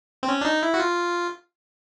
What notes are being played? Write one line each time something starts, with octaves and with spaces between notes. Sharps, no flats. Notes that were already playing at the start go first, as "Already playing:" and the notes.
C4
C#4
D4
D#4
E4
F#4
F4